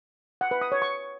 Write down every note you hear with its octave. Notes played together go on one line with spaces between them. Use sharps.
F#5
B4
D#6
C#5
C#6